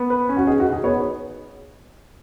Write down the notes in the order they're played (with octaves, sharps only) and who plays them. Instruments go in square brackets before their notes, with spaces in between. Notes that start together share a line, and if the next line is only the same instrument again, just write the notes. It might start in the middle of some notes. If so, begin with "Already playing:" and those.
Already playing: [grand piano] B3
B4
C#4
[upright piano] F#4
[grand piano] D#4 [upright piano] G#4
[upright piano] F#4
[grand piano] D#4
[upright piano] G#4
[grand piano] B3 [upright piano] C#5